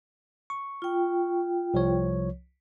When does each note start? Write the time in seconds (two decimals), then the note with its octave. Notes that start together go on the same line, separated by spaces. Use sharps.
0.50 C#6
0.82 F4 G5
1.74 C2 F3 C#5